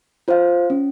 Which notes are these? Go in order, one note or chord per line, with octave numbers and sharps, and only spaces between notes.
F4 C5 F5
C#4